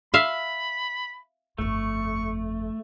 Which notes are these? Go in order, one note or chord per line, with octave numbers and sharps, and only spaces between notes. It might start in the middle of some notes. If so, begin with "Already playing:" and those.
E5 F5 B5
G1 F2 A3 C#6